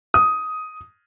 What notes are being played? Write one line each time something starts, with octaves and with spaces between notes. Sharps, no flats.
D#6